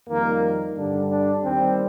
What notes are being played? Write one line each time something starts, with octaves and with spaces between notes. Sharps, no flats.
F2 D#3 G3 A#3
G2 D3 G3 D4
D4
D#2 D#3 G3 C4